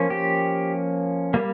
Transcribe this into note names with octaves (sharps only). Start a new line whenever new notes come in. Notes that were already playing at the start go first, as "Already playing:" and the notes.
Already playing: F3 A#3 C#4
G4
G3 A#3